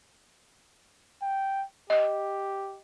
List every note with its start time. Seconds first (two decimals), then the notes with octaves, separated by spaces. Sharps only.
1.23 G5
1.90 G4 D#5